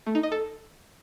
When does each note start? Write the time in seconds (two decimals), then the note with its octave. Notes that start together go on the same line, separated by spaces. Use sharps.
0.07 A3
0.15 D#4
0.23 D#5
0.32 A4